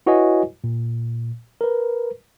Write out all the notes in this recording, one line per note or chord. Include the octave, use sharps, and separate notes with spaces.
E4 F#4 B4 C#5 D#5 G#5
A#2
A#4 B4